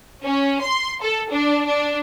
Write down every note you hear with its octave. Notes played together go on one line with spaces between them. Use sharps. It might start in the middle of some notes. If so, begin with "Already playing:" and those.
C#4
C6
A4
D4
D4